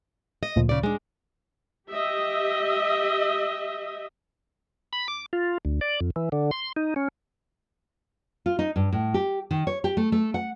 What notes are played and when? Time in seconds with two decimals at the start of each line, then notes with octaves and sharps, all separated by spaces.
0.43 D#5
0.56 D2 A#2 F3
0.69 C#3 D5
0.83 G#3 D4
1.89 G4 D#5 E5
4.93 B5
5.08 D6
5.33 F4
5.65 D2
5.81 D5
6.00 F2
6.16 E3
6.32 D3
6.51 C6
6.76 D#4
6.96 C#4
8.46 F4
8.59 D#4
8.76 G2
8.92 A2
9.14 G4
9.51 D#3
9.67 C#5
9.84 G4
9.97 A3
10.12 A3
10.34 F#5